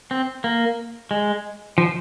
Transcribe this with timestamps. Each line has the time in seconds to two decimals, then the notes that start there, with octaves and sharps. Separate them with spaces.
0.11 C4
0.44 A#3
1.11 G#3
1.78 F3